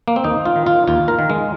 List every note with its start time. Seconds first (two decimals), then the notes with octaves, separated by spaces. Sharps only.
0.08 A#3
0.16 C4
0.24 D#2 D#4
0.45 F4
0.56 D#3
0.66 F4
0.87 D#2 F4
1.08 A#4
1.19 D#3
1.30 G#3